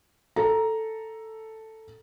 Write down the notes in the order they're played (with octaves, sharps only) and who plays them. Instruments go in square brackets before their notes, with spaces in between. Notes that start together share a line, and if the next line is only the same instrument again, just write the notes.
[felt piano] A4 A#5